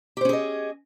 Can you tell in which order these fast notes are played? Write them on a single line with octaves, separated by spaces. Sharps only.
G4 C5 C#4 G#4 D#5